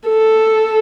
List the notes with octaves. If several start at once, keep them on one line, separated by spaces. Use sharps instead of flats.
A4